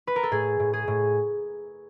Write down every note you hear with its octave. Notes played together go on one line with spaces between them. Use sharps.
B4
A#4
A4
A2 G#4
A2
G#4
A2